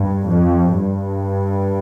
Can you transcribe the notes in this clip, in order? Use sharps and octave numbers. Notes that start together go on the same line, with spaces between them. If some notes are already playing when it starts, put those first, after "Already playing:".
Already playing: G2
F2
G2